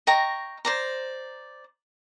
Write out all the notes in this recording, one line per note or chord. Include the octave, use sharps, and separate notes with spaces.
D#5 G5 A#5 C#6
C5 D5 A#5